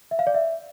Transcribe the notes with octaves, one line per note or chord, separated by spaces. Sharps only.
E5
F5
D5
E5